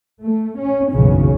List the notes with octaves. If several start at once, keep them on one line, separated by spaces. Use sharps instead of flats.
A3
C#4
F#1 B1 E2 C#3 C#4